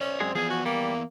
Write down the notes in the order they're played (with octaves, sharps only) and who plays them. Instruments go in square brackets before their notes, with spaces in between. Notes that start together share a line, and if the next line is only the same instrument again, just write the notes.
[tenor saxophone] C#4 [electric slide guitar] C5 D5
[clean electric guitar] F#2 G#3 G#4 [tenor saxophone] C4
[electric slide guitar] E3 B3 D5 [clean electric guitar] F3 G#5 [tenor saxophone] G#4
[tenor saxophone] F#4
[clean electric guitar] G3 [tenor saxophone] A#3